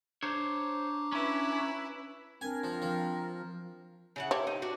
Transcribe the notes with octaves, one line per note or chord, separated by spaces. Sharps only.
D4 C5 C#5 A#5 D6
C#4 E4 B4
C4 D4 A#4 G#5
F3
F3
C#3 E4 F#5
A3 E4 G4 C#5
D#4
D4 F#4